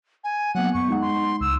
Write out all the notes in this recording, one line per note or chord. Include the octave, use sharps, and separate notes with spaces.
G#5
F#3 A#3 B3 F#5
F#2 B3 C#6
G#3 D#4 F#5
C6
C#2 E6